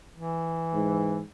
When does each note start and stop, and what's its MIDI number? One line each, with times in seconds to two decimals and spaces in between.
0.14 1.20 52
0.73 1.22 44